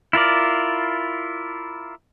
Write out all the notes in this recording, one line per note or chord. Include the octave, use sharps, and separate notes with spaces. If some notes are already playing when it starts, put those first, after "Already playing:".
E4 F4 A#4 D5